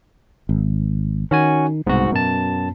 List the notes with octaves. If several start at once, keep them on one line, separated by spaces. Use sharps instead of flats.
G#1
D#3 C#4 F#4 G#5
C2 G#2 B2 F#4
F#2 B2 A5